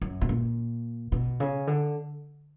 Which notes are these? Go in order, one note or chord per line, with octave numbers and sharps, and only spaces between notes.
F#2
B2
A#2
B2
C#3
D3